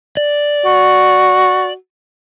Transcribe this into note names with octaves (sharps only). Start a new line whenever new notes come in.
D5
F#4